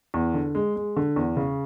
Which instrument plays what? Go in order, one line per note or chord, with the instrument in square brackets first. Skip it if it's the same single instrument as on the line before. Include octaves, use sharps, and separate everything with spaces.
[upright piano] E2
D3
G#3
G#3
D3
E2
C#3